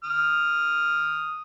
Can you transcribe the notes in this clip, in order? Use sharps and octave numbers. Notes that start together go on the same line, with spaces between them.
D#6 F6